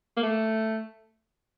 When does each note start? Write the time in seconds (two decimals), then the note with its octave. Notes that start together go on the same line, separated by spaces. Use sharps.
0.17 A#3
0.23 A3